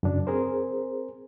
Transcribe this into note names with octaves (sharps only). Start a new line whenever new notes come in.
F#2 C#3 D4
C4 G#4 A#4 C5